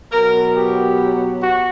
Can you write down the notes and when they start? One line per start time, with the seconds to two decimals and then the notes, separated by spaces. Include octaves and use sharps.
0.11 B2 F#3 B3 A#4
0.54 G4
1.41 F#4